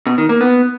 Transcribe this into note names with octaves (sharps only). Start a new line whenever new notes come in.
B2
D#3
A#3
B3